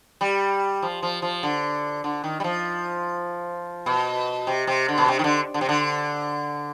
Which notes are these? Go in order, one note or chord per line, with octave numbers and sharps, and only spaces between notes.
G3
F3
F3
F3
D3
D3
D#3
G3
F3
B2
C3
C3
D3
B2
C3
D#3
D3
D3
C3
D3